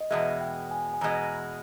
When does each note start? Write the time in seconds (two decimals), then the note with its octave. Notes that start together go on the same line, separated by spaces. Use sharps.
0.01 D#5
0.11 E2 B2 G#3 E5
0.41 G5
0.71 G#5
0.94 G#5
1.01 E2 B2 G#3 A#5